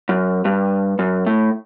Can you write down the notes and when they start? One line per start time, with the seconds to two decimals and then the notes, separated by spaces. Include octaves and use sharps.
0.09 F#2
0.45 G2
0.99 F#2
1.27 A2